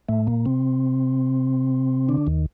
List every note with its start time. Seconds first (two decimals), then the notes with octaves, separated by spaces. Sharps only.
0.09 A2 A3
0.27 A#2 A#3
0.45 C3 C4
2.09 D3 D4
2.27 D#2 D#3